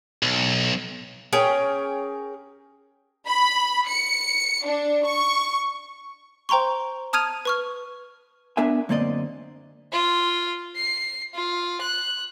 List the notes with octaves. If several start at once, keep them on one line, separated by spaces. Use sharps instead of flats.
B1
C#4 G#4 A#4 G5
B5
C#7
D4
C#6
C5 G5 A#5 C6 C#6
A5 D#6 F6 G#6 D#7 F7
B4 C#6 F6
B3 D4 A#4 E5 G#5
F#2 D3 A#3 C4 D5 D#5
F4
C7
F4
F#6